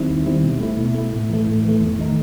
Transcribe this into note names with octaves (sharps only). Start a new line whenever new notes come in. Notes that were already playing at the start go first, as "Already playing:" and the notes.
Already playing: D#3 G3 C4 E4
D#2
D#3 G3 C4 E4
B2
A3 E4
B2
A3 E4
A2
E3 A3
A2
E3 A3
E2
D#3 A3 D#4